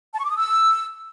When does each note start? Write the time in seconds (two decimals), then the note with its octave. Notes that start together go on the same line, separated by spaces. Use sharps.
0.14 A5
0.19 C#6
0.25 D6
0.31 D#6
0.37 E6